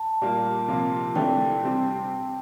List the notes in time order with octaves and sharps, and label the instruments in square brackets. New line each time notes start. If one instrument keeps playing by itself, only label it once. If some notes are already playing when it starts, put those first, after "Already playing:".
Already playing: [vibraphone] A5
[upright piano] A#2 G3 A#3
C3 F3 A#3 F4
[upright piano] C3 E3 A3 D4 [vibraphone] G5
[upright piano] C3 G3 C4